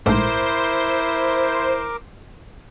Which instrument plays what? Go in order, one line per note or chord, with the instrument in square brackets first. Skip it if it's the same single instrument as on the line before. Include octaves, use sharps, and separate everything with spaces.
[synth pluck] A#1 G#2 A3 [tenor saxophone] E4 [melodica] A#4 D6 [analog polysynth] C5